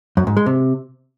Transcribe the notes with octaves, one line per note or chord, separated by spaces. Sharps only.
F#2
G#2
G#3
C3